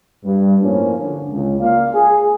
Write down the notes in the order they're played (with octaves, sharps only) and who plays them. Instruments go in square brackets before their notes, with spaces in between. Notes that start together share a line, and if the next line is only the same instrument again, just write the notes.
[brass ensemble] G2
A2 F3 A#3 C#4
D3
C#2
A#3 F4 D5 F5
G#4